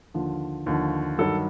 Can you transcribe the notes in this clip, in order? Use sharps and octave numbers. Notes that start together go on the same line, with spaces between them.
D#2 D3 F3
D#2 D3 F3
G2 D#3 F#3 A4